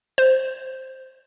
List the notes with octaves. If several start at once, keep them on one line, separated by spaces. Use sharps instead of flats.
C5